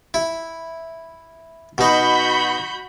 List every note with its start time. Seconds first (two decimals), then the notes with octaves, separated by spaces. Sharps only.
0.14 E4
1.78 B2 D#4 F#4 B5 G6